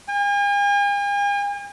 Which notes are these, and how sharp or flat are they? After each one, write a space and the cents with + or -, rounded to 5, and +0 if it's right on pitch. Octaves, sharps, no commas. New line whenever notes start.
G#5 -45